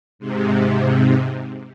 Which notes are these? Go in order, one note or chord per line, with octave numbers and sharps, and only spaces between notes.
G#2 C3